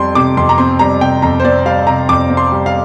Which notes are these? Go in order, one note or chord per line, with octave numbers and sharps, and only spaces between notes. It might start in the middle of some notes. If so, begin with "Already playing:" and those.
Already playing: F2 G3 C4 C6
C3 D6
F2 C6
A#5
C4 C6
G3 A#5
C3 G5
F2 A#5
C5
C4 D5
G3 F5
C3 A#5
F2 D6
C4
C6
G3
F5